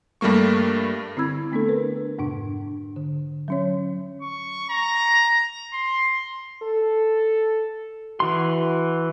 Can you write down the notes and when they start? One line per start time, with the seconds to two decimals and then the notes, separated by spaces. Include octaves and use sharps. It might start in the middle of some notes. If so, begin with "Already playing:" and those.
0.21 G2 G3 A3 A#3 C#6
1.16 D3 C4 E4 B5 E6 G#6
1.52 A3 B3 D4 A4
1.68 A#4 B4
2.18 F2 G#2 C3 D4
2.96 D3
3.48 F#3 C#4 C#5
4.21 C#6
4.70 A#5
5.73 C6
6.63 A4
8.20 E3 F#4 C6